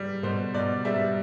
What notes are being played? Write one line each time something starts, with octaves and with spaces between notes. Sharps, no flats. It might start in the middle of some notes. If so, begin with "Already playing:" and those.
Already playing: G3
B2 C5
B2 D5
G3 E5